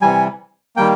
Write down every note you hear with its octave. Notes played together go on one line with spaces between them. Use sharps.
C3 E3 G3 G#5
D#3 G3 A#3 G5